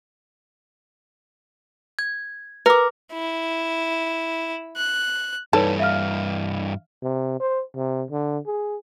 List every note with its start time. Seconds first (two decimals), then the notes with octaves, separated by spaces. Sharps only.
1.99 G#6
2.66 A#4 B4 D6
3.12 E4
4.76 F#6
5.53 G2 E3 D#4 A4 B4 C#5
5.80 E5 F5 F6
7.03 C3
7.40 C5
7.76 C3
8.11 D3
8.46 G#4